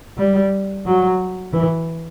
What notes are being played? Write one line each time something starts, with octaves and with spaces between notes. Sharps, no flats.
G3
F#3
E3